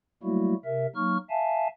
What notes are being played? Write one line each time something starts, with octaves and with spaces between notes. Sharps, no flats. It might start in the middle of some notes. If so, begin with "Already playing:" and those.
F#3 G3 A3 A#3 E4 F#4
C3 A#4 E5
F#3 A#3 D#4 C#6 F6
E5 F5 G#5 A5